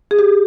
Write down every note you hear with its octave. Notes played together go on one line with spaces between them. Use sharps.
G#4
G4